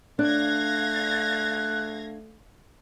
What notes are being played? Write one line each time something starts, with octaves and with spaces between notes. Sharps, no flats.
A3 D4 F5 F#6 G#6 A#6